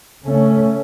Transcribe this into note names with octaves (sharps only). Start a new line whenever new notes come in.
C#3 A3 C#4